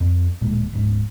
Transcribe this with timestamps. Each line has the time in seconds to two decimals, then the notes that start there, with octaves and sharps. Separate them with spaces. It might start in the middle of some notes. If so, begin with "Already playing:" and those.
0.01 F2 C4
0.41 D1 A#2 G#3
0.73 D1 G#2